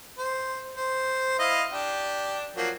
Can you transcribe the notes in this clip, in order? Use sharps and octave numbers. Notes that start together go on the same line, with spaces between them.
C5
C5
E4 D#5 F5
D4 G4
F3 F#3 A#3